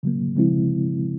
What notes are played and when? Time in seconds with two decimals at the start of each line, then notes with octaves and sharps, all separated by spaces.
0.03 C#3 F#3 A#3
0.36 C#3 F3 G#3 C4 E4